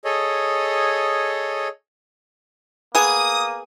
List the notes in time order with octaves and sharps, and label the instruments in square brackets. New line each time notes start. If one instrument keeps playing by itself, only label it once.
[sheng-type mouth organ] G#4 A4 C#5 D#5
[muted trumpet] A#3 [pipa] B3 G#4 [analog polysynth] D#6